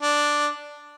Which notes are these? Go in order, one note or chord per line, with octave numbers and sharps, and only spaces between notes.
D4